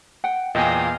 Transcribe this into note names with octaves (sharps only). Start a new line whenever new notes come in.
F#5 G5
E2 A#2 D#5 F5 G5 G#5 D#6